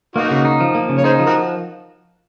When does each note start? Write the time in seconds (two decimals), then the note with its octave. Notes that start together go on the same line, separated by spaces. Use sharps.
0.16 A#3 D#4 F#4
0.31 C#3
0.45 D#4
0.60 F3
0.75 A#3
0.89 C#3
0.98 C#5
1.04 D#4 G#4 C5
1.19 F3
1.26 F#4 A#4